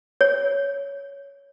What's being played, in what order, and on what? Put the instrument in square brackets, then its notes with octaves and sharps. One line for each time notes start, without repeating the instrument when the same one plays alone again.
[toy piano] C#5